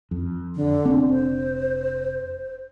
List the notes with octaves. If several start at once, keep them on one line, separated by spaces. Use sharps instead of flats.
F2
D3
F1 C4 D4
C5